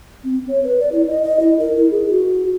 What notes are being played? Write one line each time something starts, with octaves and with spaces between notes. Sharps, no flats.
C4
C#5
B4
D5
E4
D#5
D#5
E4
A#4
E4
G#4
F#4